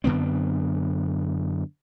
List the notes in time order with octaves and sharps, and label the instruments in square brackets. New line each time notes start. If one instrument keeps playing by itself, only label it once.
[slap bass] F#2 D3 B3 C4